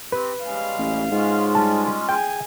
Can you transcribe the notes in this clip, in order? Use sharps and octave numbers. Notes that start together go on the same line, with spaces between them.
C4 G4 B4
G3 G#3 C#4 F5
A1
G#2 G#3 C#4 F4
G3 A5
G#4 G5 G#5